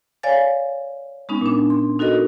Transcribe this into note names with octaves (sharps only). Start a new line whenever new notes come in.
C#5 D5 F5 G#5 A6
G#3 B3 C#4 D#4
A#2 D4
C6
D#4 F#4 A4 A#4 D#5